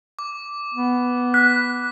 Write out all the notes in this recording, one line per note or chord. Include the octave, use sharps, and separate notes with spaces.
D6
B3
F#6 B6